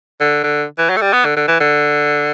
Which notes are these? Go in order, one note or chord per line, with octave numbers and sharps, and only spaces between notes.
D3
D3
E3
F#3
A3
G3
B3
D3
D3
E3
D3